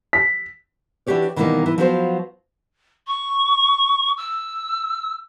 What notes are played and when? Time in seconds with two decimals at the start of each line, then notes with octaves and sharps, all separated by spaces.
0.13 B6
1.07 E3 D4 F#4 G4 C#5 D5
1.36 B2 D#3 E3 F#3 G3 A#3
1.66 E3
1.78 F3 F#3 B3 F4 F#4 C5
3.07 C#6
4.17 E6